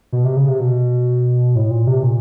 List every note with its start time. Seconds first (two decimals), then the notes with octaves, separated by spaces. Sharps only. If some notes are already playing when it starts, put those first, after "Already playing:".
0.13 B2
0.24 C3
0.37 C#3
0.48 C3
0.60 B2
1.55 A2
1.71 A#2
1.87 C3
2.03 A#2